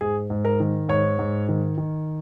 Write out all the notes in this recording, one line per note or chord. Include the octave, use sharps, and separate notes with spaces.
G#2 G#4
G#2
A#4
D#3
G#2 C#5
G#2
D#3
D#3